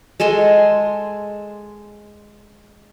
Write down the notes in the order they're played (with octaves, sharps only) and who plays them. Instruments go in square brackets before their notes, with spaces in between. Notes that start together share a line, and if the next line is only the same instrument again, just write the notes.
[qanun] G#3 A4 G#5 C6